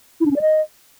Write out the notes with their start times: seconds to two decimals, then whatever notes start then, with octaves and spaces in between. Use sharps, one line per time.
0.20 E4
0.26 D4
0.31 C#4
0.36 D5
0.41 D#5